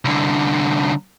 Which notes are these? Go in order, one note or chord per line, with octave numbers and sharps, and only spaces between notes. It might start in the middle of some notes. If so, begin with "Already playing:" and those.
C2 D3